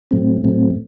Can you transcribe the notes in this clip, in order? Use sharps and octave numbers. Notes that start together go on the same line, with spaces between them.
A2 F#3 A3 C4
A2 F#3 A3 C4